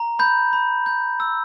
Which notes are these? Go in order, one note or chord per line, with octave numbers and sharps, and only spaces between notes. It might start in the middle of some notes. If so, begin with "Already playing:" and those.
Already playing: A#5
B5 G6
B5
G6
E6